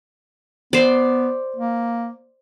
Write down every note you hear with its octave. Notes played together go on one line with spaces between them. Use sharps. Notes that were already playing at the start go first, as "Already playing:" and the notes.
B3 C5 D5
A#3